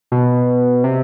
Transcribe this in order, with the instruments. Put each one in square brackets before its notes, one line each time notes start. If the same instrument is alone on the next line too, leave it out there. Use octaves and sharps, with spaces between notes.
[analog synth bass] B2
C3